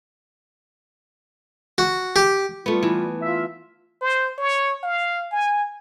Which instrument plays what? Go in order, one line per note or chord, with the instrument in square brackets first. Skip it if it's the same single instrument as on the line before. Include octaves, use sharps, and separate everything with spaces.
[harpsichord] F#4
G4
[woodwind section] G3 F4 [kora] A3 B3
[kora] E3
[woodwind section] F4 E5
[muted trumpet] C5
C#5
F5
G#5